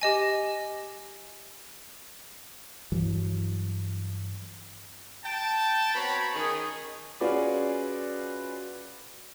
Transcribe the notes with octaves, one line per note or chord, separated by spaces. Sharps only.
G4 D#5 G#5
G2 E3 F#3
G5 A5
B3 C4 F#4 C#5 A#5 B5
D#3 C#4 D#4 G#4
C#4 F4 F#4 G#4 B4 D5